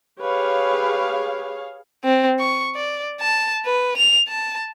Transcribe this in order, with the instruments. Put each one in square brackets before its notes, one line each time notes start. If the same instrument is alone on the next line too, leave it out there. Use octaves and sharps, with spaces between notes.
[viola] G4 B4 [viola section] G#4 C#5 F5
[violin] C4
C#6
D5
A5
B4
F7
A5